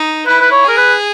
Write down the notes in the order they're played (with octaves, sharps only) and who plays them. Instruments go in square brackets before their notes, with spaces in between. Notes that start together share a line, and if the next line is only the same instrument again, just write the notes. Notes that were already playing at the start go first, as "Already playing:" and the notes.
Already playing: [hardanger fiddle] D#4
[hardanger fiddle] E4 [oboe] B4
[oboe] B4
C#5
[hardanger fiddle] G#4 [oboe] A#4
[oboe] B4